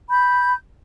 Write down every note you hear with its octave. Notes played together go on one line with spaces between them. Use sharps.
B5 G6